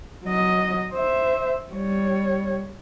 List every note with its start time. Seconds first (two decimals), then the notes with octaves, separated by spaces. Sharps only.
0.24 F#3 D#5
0.93 C5 E5
1.72 G3 C#5